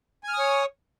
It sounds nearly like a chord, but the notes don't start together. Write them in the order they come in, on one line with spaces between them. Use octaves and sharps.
G#5 F6 D#6 C#5